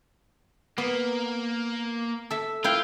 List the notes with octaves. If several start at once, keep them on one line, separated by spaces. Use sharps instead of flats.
A#3 B3
A4 E5
E4 F4 F5 G5